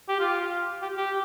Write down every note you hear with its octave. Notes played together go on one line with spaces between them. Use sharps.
G4
F4
G4
G4